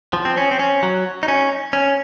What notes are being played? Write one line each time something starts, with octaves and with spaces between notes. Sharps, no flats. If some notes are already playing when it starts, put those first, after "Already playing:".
F3
C4
C#4
C4
C#4
F#3
D#4
C#4
C#4